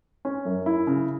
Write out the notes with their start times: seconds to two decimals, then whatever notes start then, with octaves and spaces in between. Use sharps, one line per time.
0.25 C#4
0.45 F#2
0.66 E4
0.87 C#3